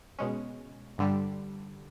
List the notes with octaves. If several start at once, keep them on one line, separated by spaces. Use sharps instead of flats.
B2 G#3 C#4
G2 D3 G3